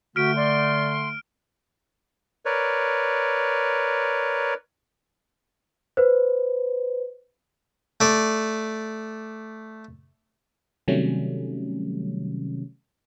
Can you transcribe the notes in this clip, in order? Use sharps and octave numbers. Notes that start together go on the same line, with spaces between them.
D3 A3 F#4 F6 B6 D7
D5 C6
A#4 B4 C#5 D5
B4 C5
A3 D5
C3 D#3 F#3 G3 A3 C#4